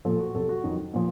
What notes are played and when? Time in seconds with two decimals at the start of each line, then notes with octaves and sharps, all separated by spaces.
0.05 A#2 F3 A4
0.19 F#4
0.34 F2 C3 F#3 A4
0.49 F#4
0.64 F2 D#3 F#3
0.93 A#2 F3